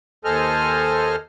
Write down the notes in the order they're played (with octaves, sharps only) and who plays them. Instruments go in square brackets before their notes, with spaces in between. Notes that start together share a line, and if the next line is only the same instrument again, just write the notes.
[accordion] D#2 A4 C5 D#5 G#5 F6